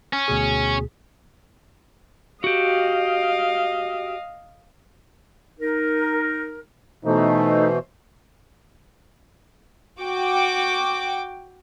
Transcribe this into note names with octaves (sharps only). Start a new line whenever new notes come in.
C#4
D2 B2 G#4
F#4 G4 D#5 F5
D#4 A#4
B2 E3 A3 D#4 C5
F#4 G5 D6